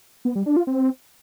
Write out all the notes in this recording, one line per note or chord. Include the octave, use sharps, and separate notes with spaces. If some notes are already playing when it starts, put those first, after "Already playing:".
B3
G3
D4
F4
C4